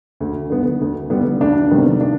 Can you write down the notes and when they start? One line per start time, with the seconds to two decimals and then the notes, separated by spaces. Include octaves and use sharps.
0.20 D2
0.50 D3 G3 B3
0.81 D2
1.10 D3 G3 B3
1.41 D2 D4
1.71 C3 D#3 G3 B3
2.01 D4